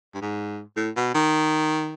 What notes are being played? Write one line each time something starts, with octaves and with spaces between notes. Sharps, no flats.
G2
G#2
A2
B2
D#3